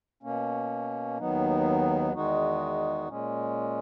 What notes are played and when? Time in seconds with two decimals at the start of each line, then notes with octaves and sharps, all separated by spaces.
0.23 B2 A#3 C#4
1.18 D#2 D#3 F#3 B3 D#4
2.13 E2 D#3 G#3 D#4 F#4
3.08 A#2 G#3 C#4